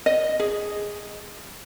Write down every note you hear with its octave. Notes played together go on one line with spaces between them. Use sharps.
D#5
G#4